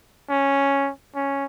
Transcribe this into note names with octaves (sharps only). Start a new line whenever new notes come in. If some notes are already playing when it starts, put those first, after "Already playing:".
C#4
C#4